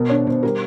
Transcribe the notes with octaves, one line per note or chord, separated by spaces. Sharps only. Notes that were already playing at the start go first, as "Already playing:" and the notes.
Already playing: B2 A#4
D4 C#5
B2 C5
G3 A#4